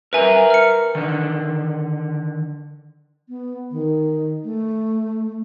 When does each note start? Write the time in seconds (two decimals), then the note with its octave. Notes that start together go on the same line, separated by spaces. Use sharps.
0.13 A#4 B4 E5 G#5 A#5
0.50 F6 C#7
0.95 D3 D#3
3.28 B3
3.71 D#3
4.44 A3